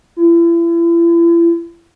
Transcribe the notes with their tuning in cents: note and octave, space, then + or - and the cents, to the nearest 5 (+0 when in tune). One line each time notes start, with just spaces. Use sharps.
E4 +40